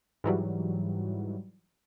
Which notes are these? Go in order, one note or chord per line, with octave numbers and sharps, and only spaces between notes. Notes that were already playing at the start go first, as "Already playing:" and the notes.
G#2 E3 F#3 G3